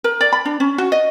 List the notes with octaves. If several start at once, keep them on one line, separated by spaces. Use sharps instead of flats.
A#4
D5
B5
D4
C#4
F#4
D#5